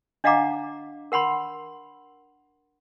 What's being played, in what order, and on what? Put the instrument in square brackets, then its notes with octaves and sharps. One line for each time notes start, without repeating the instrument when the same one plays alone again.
[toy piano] D4 D#5 F5 F#5 A#5 D6
A#4 F#5 B5 C6